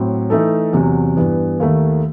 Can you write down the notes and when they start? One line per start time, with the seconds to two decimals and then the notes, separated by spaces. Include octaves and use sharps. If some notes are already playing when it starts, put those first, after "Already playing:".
Already playing: A2 F#3 C4
0.30 E3 A3 D#4 A4
0.73 E2 C3 F#3
1.17 G2 E3 B3
1.60 D#2 D#3 A3